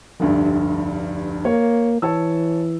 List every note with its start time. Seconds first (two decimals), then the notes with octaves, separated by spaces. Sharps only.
0.20 F1 D2 G2
1.45 A#3 C#5
2.02 E3 C#5 A5 E6